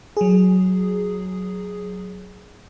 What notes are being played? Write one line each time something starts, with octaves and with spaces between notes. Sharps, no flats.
F#3 G#4